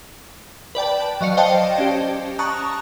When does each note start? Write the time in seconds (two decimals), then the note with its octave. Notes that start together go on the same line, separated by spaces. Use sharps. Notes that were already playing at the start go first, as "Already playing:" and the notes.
0.75 B4 D5 G5 A5
1.21 F#3 D#5 F5 C#7
1.37 C5 D5 D#5 F5 G5 A5
1.78 C#4 G4
2.39 A5 A#5 C#6 D#6 F#6